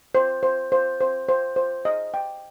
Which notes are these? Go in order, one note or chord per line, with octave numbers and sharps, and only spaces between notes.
C5
C5
C5
C5
C5
C5
D#5
G5